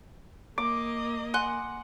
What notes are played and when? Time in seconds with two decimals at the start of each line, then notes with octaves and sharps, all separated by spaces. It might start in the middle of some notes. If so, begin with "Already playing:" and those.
0.58 A#3 D#5 D6
1.34 F#5 G#5 C6 F#6